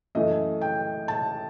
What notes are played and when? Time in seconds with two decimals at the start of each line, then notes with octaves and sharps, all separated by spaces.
0.15 F#2 E3 A3 D#5
0.61 G5
1.08 A5